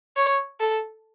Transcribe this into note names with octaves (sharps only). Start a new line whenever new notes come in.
C#5
A4